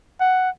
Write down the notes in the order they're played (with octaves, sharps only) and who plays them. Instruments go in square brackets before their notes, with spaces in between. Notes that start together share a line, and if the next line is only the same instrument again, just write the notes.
[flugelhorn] F#5